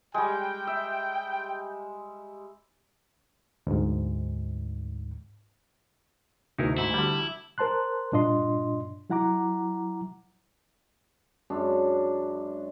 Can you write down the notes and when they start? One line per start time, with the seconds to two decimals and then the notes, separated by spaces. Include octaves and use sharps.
0.14 G3 G#3 G5
0.67 E5
3.67 D2 G#2
6.58 D2 D#4 E4 A#4
6.78 G#2 E4
6.94 D3 G3
7.58 A#4 C5 A5 C6 F#6
8.12 G2 A#2 D4 F4 D#5 C6
9.10 F#3 E4 F#5 A#5 D6
11.50 F#2 G#3 D4